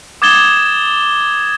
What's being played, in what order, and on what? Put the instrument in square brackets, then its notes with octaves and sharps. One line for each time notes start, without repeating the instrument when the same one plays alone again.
[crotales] D6 D#6 G#6 A6 E7 G7